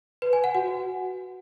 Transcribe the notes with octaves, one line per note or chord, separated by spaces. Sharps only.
B4
G#5
F#5
F#4